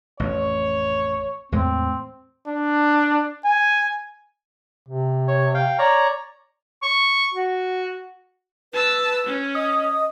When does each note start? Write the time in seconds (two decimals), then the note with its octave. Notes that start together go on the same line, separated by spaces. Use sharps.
0.20 A1 F2 C#5
1.52 E2 A2 G#3 C4
2.48 D4
3.45 G#5
4.88 C3
5.28 C#5
5.54 F5 G5
5.79 C#5 D5 A#5
6.83 C#6
7.34 F#4
8.73 B4 A5 E6
9.26 C#4
9.55 D#5 D#6